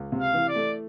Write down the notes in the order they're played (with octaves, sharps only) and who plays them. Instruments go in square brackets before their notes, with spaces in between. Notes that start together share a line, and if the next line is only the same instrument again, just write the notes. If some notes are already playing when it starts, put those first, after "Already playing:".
Already playing: [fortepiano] C#2
C3
[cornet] F5
[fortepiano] E3
[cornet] D5
[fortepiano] A3